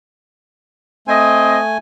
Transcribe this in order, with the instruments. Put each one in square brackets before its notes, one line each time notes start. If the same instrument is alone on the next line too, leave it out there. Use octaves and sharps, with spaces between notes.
[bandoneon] A3 G#5 [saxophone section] C4 D#5